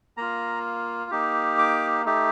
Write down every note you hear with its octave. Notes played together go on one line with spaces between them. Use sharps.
A#3 F4 A#5
A#3 D#4 G4
D6
A3 D#4 G4